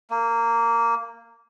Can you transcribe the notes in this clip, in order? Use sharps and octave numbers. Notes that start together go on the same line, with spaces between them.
A#3